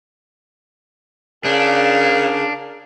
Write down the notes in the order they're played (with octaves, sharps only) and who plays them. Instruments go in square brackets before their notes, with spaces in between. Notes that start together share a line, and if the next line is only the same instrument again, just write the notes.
[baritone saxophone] C#3 [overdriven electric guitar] D4 [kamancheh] A#4 F5